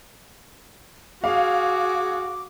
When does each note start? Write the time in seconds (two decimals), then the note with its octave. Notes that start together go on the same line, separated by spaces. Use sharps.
1.24 F#4 G#4 F5 D6